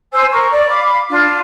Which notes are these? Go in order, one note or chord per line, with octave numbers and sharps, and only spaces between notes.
C5 G#5 E6
A#4 A#5 C#6
D5
F5 B5 D6
D4 F4